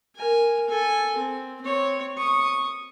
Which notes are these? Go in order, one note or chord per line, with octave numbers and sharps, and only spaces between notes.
A#4 G#5
A4 G#5
C4
C4 C#5
C#6 D#6